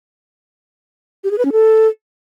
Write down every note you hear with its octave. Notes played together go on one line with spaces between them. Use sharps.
G4
G#4
B4
C#4
A4